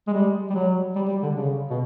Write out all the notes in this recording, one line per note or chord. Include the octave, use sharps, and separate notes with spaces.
G#3
G3
G3
F#3
G3
G3
D3
C#3
B2